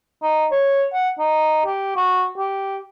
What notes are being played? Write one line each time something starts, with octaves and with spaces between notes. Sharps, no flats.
D#4
C#5
F#5
D#4
G4
F#4
G4